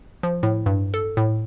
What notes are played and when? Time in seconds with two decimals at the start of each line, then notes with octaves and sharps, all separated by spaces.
0.23 F3
0.43 A2
0.66 G2
0.94 A4
1.17 A2